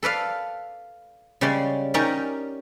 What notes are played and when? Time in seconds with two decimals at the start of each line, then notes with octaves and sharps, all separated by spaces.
0.03 A4 B4 D5 F5
1.41 C#3 G3 G#3 C#5 D5 C6
1.94 C#4 D#4 G4 A#4 D5